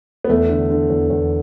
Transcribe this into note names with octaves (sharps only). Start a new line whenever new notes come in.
B3
E2 A3
D3
D3
E2
E2